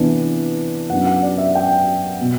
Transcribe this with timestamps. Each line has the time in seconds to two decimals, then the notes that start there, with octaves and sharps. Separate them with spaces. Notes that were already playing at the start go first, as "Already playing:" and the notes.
Already playing: E2 C3 E3 B3 D4
0.90 F#2 F#3 B3 D4 F#5
1.06 F#5
1.22 D5
1.38 E5
1.55 G5
2.21 B2